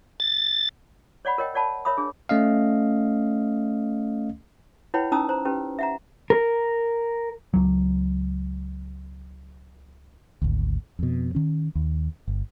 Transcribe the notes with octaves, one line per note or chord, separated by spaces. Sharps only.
A6
C#5 D5 F#5 B5
A#4 C#5 D#5 G5
C#5 D5 F#5 A5 B5
A#4 C#5 E5 B5 D#6
D4 G#4
A3 C#4 D#5 F5
E4 B4 C#5 F#5 G5 B5
C#4 D#4 A5 A#5 D#6 E6
C5 A#5
C#4 G4 B4
E5 F#5 A#5
A#4
C#2 F#3
G#1 D2
F2 B2
D#3 C#4
D#2
G1